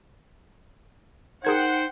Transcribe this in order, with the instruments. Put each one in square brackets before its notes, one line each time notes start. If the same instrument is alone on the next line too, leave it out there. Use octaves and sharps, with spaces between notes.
[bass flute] D#4 [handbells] G#4 A#4 G#6 [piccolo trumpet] C5 [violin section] F#5 G5